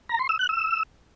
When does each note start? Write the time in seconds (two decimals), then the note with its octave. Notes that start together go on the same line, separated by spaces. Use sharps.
0.09 A#5
0.19 C6
0.29 E6
0.39 F#6
0.49 E6